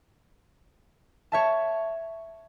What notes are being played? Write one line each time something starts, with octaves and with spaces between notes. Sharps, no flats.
C#5 E5 A5